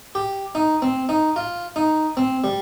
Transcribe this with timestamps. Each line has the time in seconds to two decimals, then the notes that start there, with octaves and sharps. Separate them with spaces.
0.15 G4
0.55 D#4
0.82 C4
1.09 D#4
1.36 F4
1.76 D#4
2.17 C4
2.44 G3